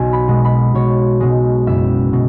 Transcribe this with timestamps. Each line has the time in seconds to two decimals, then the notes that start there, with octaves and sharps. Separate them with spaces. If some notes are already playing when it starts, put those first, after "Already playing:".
Already playing: B1 G#5
0.13 B5
0.28 B2 G#3
0.45 B5
0.74 B1 C#5
1.20 B2 G#3
1.67 F#1 E5
2.13 B2